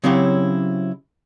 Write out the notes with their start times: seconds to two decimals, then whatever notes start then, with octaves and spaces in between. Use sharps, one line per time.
0.04 C#3 F#3 C4 C#4 E4 G4